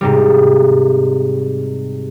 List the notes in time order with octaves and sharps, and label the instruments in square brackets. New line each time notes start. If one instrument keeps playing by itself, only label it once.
[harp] G#2 C3 G3